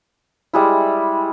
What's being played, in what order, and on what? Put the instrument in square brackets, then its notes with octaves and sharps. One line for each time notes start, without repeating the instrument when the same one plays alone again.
[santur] G3 G#3 E4